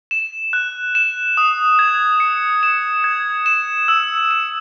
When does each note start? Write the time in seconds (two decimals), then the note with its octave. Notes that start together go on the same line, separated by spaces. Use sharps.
0.11 E7
0.53 F#6
0.95 E7
1.37 D#6
1.79 G#6
2.20 C#7
2.63 E7
3.04 G#6
3.46 E7
3.88 E6
4.31 E7